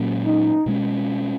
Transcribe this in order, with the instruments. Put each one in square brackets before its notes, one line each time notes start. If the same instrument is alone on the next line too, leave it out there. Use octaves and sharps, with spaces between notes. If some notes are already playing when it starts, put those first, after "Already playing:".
Already playing: [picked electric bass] A#2 F#3 A#3 C#4
[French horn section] D#4
[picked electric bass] B2 G#3 C#4